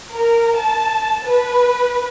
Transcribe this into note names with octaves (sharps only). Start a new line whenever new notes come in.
A#4
A5
B4